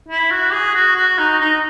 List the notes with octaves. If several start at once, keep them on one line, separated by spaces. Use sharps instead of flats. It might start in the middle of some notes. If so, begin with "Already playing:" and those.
E4
F#4
G#4
F#4
F#4
D#4
D#4